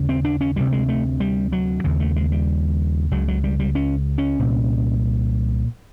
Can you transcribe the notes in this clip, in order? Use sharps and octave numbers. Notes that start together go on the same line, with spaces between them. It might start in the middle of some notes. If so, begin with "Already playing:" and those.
Already playing: D#2 C#3
C4
D4
C#4
D2 C3 G3
G#3
A3
G3
F#3
D#2 C#3
A3
G#3
G3
C#2 C#3 F#3
F#3
G3
G3
C#4
C#4
C2 A#2